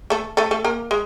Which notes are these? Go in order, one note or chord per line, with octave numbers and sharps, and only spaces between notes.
A3 A4
A3 A4
A3 A4
A#3 A#4
G#3